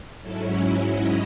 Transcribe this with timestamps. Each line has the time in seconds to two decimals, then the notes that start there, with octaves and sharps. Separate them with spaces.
0.21 G#2 F#3 C#4 E4 A4
0.85 D#5